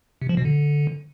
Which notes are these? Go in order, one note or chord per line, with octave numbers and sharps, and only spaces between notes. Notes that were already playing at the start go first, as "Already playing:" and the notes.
C3
F3
B2
D3